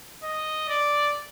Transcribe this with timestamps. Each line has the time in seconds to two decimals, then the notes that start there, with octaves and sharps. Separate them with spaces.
0.23 D#5
0.68 D5